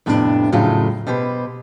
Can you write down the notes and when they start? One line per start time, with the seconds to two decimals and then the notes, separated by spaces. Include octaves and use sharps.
0.06 F2 A2 C3 B3 C4 D4
0.52 F2 A2 C#3 F#3 A3 F4
1.07 B2 G4 B4 C5